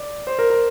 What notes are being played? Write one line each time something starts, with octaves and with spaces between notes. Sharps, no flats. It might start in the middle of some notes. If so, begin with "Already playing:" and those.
Already playing: D5
C5
A#4
A#4